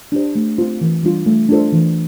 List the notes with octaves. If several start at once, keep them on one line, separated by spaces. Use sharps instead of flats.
D4 G4 C5
A3
C4 F4 C5
E3
G3 D4 F4
A3
D4 F4 A4 C5
E3